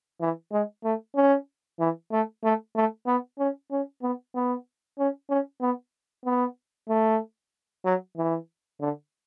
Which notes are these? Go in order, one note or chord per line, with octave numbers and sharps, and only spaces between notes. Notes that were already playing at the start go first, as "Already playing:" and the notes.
E3
G#3
A3
C#4
E3
A3
A3
A3
B3
C#4
C#4
B3
B3
C#4
C#4
B3
B3
A3
F#3
E3
D3